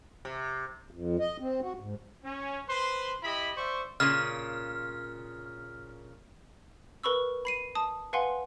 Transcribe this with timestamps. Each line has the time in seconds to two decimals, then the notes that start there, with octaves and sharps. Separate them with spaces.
0.25 C3
0.91 F2
1.19 D#5
1.40 C4
1.61 F#4
1.79 G#2
2.25 C#4
2.70 B4 C5 C6
3.24 E4 G4 D#5 B5
3.57 C5 D5 E5 C6 C#6
4.00 A#2 C#3 F6
7.03 A#4 B4 B5 C#6 E6
7.45 B5 C7 D#7
7.75 A5 D#6
8.13 B4 F5 F#5 G#5 C6